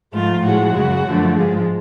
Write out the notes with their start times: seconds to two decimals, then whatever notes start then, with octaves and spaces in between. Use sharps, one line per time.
0.13 G#2 F3 A3 F4
0.44 A2 F3 G#3 F#4
0.75 F#2 C#3 G#3
1.06 F#2 D3 F3 A3
1.36 G#2 F3 G#3